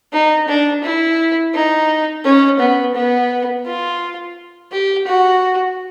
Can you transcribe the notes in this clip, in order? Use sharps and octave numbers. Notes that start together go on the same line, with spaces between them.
D#4
D4
E4
D#4
C#4
B3
B3
F4
G4
F#4